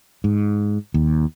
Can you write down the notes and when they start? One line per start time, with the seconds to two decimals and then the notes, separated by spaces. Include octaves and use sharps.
0.24 G#2
0.94 D#2